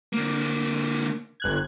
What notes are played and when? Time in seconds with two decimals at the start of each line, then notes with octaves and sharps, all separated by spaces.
0.13 D3 A#3
1.40 G1 F#6 G#6